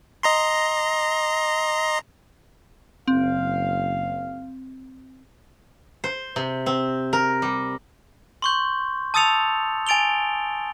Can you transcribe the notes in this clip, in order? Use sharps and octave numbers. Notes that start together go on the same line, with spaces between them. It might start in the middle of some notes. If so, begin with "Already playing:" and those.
D#5 A#5 C6
F#1 C4 F5
C5
C3
C4
A#4
G3
C6 C#6 G6
A5 D#6 E6 A6 C#7 F7
G#5 A6 D7 F7 G7